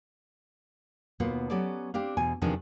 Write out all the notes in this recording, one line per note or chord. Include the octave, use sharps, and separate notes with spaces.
D#2 B2 A#3 B3 F4 F#5
F#3 B3 C#4 G4 A4 D5
C4 D4 G4 F5
E2 B2 G#5
E2 C3 D#3 F3 D4 G#5